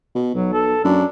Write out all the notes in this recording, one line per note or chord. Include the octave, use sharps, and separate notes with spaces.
B2
B1 F#3
A4
F#2 D4